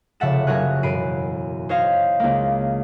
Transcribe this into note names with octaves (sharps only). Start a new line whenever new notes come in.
F1 C#3 E5 F#5 A6 E7
F#1 F#4 A#4 C#5 G#5 F#6
E1 F#2 B5 C7 D7 D#7
C5 C#5 D#5 F5
C#2 A#3